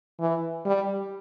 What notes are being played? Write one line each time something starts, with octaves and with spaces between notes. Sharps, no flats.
E3
G3